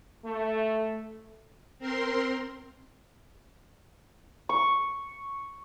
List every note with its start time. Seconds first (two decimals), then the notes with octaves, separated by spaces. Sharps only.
0.25 A3
1.79 C4 A#4 C6
4.49 C#6